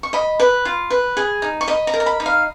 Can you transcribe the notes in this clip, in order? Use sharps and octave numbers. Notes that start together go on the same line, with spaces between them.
C#6
D#5 B5
B4
F4
B4
G#4
D#4
C#6
D#5 B5
A#5
A#4
A#5
B5
D#4
F5